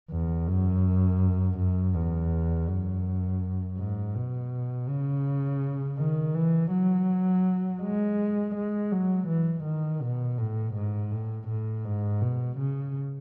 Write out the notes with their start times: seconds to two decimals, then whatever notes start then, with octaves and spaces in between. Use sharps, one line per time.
0.11 E2
0.48 F#2
1.58 F#2
1.95 E2
2.67 F#2
3.78 G#2
4.15 B2
4.88 C#3
5.98 D#3
6.35 E3
6.71 F#3
7.82 G#3
8.55 G#3
8.92 F#3
9.28 E3
9.64 D#3
10.02 B2
10.38 A2
10.74 G#2
11.12 A2
11.48 A2
11.85 G#2
12.21 B2
12.58 C#3